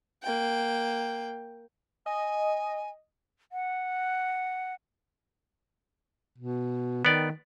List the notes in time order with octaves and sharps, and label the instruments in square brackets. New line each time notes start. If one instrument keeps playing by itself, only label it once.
[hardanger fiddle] A#3 G5
[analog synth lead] D#5 [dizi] G#5
[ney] F#5
[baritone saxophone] B2
[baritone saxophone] D#3 [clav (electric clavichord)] B3 D5 G5